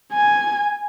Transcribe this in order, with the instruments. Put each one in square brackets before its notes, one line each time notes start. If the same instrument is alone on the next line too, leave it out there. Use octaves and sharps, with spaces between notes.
[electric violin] G#5